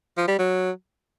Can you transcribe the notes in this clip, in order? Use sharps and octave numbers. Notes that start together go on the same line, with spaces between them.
F3
G3
F#3